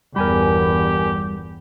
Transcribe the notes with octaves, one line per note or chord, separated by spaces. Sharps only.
G1 E2 G3 G4 A#4 G#5 B5